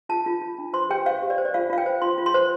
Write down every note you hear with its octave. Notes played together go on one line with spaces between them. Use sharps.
F4 A5
F4
F4
D4
C5 C6
G4 G5
C5 F5
G4
D5
C5
D5
F4 F5
F4 F5
G5
C5
F4 C6
F4
C6
C5